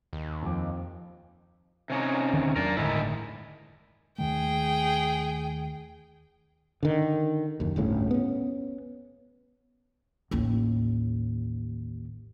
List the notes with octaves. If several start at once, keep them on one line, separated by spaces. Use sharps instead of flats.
D#2
F2 F3 D6
C3 C#4 D#4
D#1 D3 D#3
E2 F#3 D4 A#4 D5
G1 A2 D3 D#3 G#3 E4
D#2 D#3 A3 G#4 G5
D3 D#3
F#1 D#2
G1 D2 A2 C#3
B3 C#4
A1 D#2